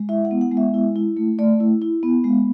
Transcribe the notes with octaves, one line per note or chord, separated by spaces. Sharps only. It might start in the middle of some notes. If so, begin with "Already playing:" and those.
Already playing: G#3
E4 E5
F#5
B3
F#5
G#3
E5
E4
E4
A3
A3 D5
E4
E4
B3
G#3